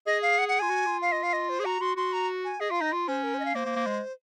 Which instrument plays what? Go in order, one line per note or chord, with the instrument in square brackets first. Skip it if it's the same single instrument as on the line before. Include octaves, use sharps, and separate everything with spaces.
[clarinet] G#4 [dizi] D#5
[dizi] F5
F#5
F#5
[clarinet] F4 [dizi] G#5
[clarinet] F#4
F4
[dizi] F5
D#5
F5
D#5
C5
[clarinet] G#4
[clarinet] F#4 [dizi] A#5
[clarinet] F#4 [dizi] C6
[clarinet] F#4 [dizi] C6
[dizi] A#5
G#5
[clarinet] G#4 [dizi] D#5
[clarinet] F4 [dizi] F5
[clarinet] D#4 [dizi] D#5
[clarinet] F4
[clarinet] C#4 [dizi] C5
[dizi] A#4
C5
D#5
F5
[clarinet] A#3 [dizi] C5
[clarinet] A#3
A#3
G#3